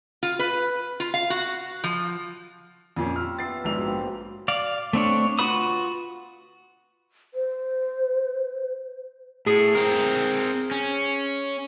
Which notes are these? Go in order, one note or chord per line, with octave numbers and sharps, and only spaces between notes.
F4
B4
F4
F5
F#4
F3
F2 A#2 C#4
G3 F4 E6 F6
B3 E5 A6 C7
A#1 G#2 F#3 G3 G4 F7
A#2 F3 E4
D5 F5
A3 C4 D4 C#5
F4 F#4 B4 B5 D#6
C5
A2 G#4
C4 A#4
C#4